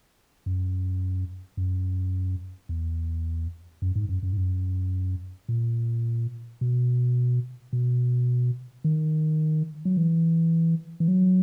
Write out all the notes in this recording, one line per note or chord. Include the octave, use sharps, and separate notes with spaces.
F#2
F#2
E2
F#2
G#2
F#2
F#2
G#2
F#2
A#2
B2
B2
D#3
F#3
E3
E3
F#3